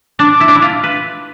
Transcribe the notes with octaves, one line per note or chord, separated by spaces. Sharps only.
D4 D6
E4
D4
E4
F4
B4